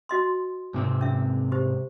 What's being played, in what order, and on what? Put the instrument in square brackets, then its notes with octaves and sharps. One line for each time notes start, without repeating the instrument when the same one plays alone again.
[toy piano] F#4 D#5 C6
[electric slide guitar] G#2 C3 C4
[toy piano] C#4 E5
G4 C5